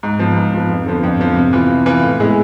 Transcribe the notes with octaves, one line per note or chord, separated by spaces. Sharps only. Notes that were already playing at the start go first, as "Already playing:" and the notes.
G#2
F3 B3
G#2
F3 B3
F2
D3 F3 B3
F2
D3 F3 B3
C3
E3 B3 F4
C3
E3 B3 F4
A2
G#3 B3 E4 G#4